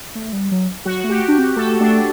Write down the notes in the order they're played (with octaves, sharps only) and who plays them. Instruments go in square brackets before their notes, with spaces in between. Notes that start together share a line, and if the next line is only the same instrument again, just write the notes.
[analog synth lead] A3
G3
F#3
[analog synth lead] F#3 [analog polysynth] F#4
[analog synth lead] A3
[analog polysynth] G4
[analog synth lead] D4
C4
[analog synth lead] A3 [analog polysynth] A4
[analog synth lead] A3 [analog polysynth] D4